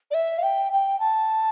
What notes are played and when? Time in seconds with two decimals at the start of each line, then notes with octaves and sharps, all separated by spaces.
0.11 D5
0.14 E5
0.38 F5
0.43 G5
0.73 G5
1.00 A5